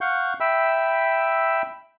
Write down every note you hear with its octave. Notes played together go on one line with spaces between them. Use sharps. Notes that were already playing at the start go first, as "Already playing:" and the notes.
F5 F#5 C#6 G6
E5 G5 B5 E6